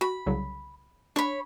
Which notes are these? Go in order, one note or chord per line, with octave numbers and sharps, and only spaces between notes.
F#4 B5
C2 C#3 F#3
D4 C#5 B5